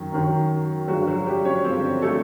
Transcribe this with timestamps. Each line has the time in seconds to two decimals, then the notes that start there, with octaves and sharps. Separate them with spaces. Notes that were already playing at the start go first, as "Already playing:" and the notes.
Already playing: F#2 D#3 F#3
0.12 F#2 D#3 F#3
0.88 G2 D3 F3 F#3 G#3 F#4
1.07 F#3 F#4
1.26 G3 G4
1.45 C#4 C#5
1.64 G2 D3 F3 G#3 C4 C5
2.02 A3 A4